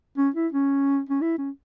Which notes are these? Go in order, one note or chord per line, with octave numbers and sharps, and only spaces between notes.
C#4
E4
C#4
C#4
E4
C#4